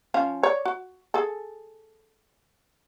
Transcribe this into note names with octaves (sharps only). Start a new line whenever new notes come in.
F3 C#4 F5
C#5 D5
F#4
G#4 A4